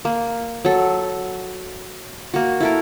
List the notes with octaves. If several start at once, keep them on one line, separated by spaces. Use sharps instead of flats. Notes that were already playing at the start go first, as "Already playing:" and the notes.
A#3
F#3 A4
A#3 F#4
E4 A4 A#4